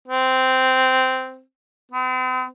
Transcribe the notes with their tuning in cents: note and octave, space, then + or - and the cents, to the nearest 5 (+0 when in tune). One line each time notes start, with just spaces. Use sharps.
C4 -10
C4 -45